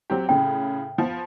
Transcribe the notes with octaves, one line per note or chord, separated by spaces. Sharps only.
F#3 C4 G4
A2 C#3 G5
F3 B3